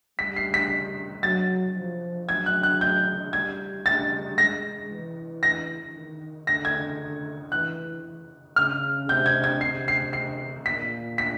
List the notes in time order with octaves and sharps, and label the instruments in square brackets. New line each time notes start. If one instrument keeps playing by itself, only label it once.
[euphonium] G3 [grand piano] B6
[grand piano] C7
B6
[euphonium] F#3 [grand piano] A6
[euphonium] F3
[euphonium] F#3 [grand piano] G#6
[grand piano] F#6
F#6
G6
[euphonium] G3 [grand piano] G#6
[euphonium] G3 [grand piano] A6
[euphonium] G#3 [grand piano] A#6
[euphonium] E3
[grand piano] A#6
[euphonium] D#3
[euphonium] D3 [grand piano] A#6
[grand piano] G#6
[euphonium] E3 [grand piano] F#6
[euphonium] C#3 [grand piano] F6
[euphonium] C3 [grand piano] G6
[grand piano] G#6
G#6
[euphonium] C3 [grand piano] C7
[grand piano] C7
C7
[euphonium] A#2 [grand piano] B6
[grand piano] B6